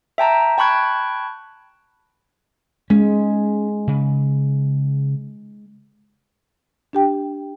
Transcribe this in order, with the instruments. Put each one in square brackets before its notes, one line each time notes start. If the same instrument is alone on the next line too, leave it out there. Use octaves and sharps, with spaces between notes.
[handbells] E5 G5 A5 A#5
G5 A5 B5 C#6 F#6 G#6
[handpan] G#3 [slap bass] C#4
[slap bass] C#3
[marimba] D4 G4 G5